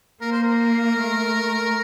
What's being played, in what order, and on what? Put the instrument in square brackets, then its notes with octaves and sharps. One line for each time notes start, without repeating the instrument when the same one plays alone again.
[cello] A#3 [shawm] A#4
[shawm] C5
A#4
[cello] A3